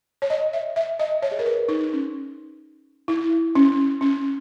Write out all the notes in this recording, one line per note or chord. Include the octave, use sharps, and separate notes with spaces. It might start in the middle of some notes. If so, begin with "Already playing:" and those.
C#5
D#5
E5
E5
D#5
C#5
G#4
A#4
B4
D#4
C#4
E4
C#4
C#4